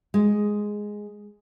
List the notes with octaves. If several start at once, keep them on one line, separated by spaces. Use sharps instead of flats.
G#3